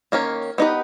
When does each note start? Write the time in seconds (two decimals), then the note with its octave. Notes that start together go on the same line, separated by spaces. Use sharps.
0.12 D#3 A#3 C#4
0.58 B3 D#4 G4 B4